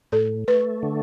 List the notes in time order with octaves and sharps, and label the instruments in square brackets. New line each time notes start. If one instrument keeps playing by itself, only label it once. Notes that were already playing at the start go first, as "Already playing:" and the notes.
[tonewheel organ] A2 [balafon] A4
[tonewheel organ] A3 [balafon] B4
[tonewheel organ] D3